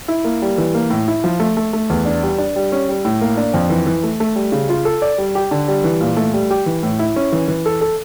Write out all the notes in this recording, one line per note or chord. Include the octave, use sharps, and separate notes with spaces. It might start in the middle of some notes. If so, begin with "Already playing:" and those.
E4
A#3
G3
E3
A#3
A2
E4
F3
A3
A3
A3
E2
D4
G3
D4
G3
C#4
G3
A2
A#3
D4
F2
E3
E3
A3
A3
G3
C#3
F4
A4
D5
G3
G4
D3
G3
E3
A#2
A3
G3
G4
E3
A2
E4
C#4
E3
E3
A4
A4